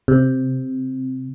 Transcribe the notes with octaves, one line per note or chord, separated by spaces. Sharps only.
C3